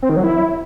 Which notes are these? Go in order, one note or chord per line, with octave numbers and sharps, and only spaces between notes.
C4
D#3
F#3
E4